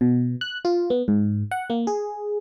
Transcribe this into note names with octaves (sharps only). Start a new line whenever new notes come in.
B2
F#6
F4
B3
G#2
F#5
A#3
G#4